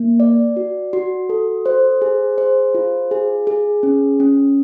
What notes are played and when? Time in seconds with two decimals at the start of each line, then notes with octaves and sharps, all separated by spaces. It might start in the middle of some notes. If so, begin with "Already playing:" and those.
Already playing: A#3
0.20 D5
0.56 F#4
0.93 F#4
1.29 A4
1.66 C5
2.02 G#4
2.38 C5
2.75 F4
3.11 G#4
3.47 G#4
3.83 C#4
4.20 C#4